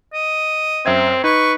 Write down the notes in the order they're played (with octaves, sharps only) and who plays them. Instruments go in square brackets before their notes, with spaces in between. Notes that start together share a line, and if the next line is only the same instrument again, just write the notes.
[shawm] D#5
[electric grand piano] F#2 E5 G#6 [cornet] C4
[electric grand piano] D#4 [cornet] B4 [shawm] C#6